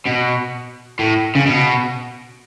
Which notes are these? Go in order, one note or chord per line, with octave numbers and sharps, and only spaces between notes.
B2
A2
C#3
B2